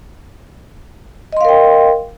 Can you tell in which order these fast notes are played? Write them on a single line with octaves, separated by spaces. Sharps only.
D#5 C6 F5 A#4 G5